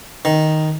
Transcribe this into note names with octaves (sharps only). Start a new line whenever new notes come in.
D#3